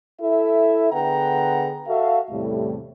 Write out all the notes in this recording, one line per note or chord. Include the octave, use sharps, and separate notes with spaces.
E4 A4 E5
D3 B3 G#4 F#5 G5 A#5
F#4 A4 E5 F5
E2 A2 C3 G3 A3